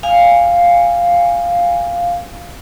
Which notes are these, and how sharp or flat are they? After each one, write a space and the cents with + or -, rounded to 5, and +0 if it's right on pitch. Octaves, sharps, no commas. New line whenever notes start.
F5 +0 G#5 -20